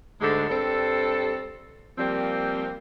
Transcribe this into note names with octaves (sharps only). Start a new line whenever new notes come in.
D2 G#2 D3 G#3 A4
G2 G3 C4 A4
F3 G3 A#3 C4